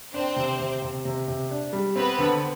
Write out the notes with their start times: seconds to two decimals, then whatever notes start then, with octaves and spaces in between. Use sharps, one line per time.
0.14 C4 D4 C5
0.36 C3
0.59 C3
0.82 C3
1.05 C3
1.28 C3
1.51 D4
1.73 G3
1.96 B3 C4 B4
2.19 D3